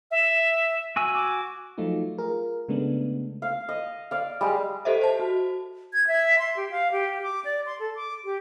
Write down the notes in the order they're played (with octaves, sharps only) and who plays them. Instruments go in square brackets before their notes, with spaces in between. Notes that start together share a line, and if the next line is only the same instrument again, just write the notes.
[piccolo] E5
[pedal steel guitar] F#4 G#5 E6
[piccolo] D6
[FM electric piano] F3 F#3 A3 D#4 F4
F4 G#4 A#4
C#3 G#3 A3 B3 D4
[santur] F5
D#5
D5 F5
G3 G#3 G4
[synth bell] G4 A4 C5 D#5 E5
C5 A5
F#4
[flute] G#6
E5
C6
G4
F5
G4
D6
D5
C6
A4
D6
G4